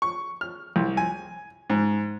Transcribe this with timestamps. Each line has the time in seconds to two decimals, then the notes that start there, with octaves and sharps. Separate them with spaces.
0.02 C#6
0.41 F6
0.76 C2
0.97 G#5
1.70 G#2